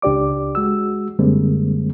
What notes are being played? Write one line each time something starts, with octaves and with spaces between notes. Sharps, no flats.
C#2 D4 G4 D5 D6
G#3 F#4 E6
F#2 D3 G3 G#3 A#3 C4